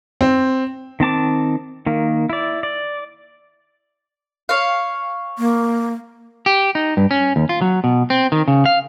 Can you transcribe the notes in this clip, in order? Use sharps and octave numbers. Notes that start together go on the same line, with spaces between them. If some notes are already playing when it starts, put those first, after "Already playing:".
C4
D#3 C4 A5 D6
D#3 A#3
E4 D5
D5
C#5 F5
A#3
G4
D#4
G2
C#4
D#2
F4
F#3
B2
C4
D#3
C#3
F5